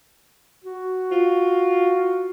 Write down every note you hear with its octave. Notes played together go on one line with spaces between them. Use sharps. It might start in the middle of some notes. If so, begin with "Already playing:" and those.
F#4
F4